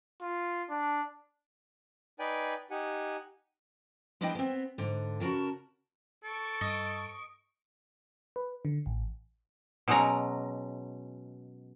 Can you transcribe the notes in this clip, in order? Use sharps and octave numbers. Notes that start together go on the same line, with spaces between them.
F4
D4
D#4 B4 D5 G5 G#5
D#4 G4 F#5 G#5
G#3 B3 D4 E4 D#5 G5
B3 C4
G#2 D3
C#3 F#4 A#4 A5
A4 C#6 D7
G2 D#5
B4
D3
A1
B2 F#3 G#3 C#4 A#5